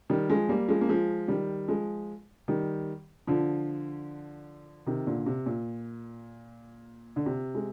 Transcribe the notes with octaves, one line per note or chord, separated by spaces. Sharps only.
D#3 G3
F3 G#3
G3 A#3
F3 G#3
A#3
F3 G#3
D#3 G3
F3 G#3
D#3 G3
D3 F3
C3 D#3
A#2 D3
C3
A#2
D3
C3
G#3